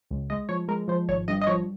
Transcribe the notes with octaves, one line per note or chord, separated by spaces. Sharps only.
C#2
G#3 D#5
F3 C#5
G#3 A#4
F3 C5
G#1 C#5
G2 D#5
D#5
F3 C#5